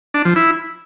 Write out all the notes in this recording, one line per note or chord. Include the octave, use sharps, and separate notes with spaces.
D4
F3
E4